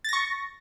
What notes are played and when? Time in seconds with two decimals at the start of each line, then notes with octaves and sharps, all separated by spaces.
0.04 A6
0.09 A#6
0.13 C#6